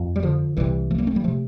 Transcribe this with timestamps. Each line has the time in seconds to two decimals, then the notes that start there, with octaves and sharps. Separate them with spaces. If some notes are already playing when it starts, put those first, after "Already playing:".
Already playing: F2
0.16 G3
0.23 D3 F3
0.57 C2 C3 E3 G3
0.91 F3 A3
0.98 G3 A#3
1.07 A3 C4
1.15 G3 A#3
1.24 C3 F3 A3